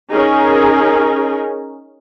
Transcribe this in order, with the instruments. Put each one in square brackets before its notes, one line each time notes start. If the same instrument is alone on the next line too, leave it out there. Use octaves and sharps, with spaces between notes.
[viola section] C#4 D#4 G#4 A#4